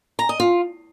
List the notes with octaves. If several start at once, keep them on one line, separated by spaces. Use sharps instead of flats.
A#5
D#5
F4